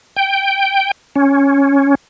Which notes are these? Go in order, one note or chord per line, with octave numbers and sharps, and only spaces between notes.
G5
C#4